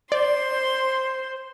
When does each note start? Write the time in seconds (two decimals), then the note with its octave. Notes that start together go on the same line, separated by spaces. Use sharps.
0.12 C5 D5 C6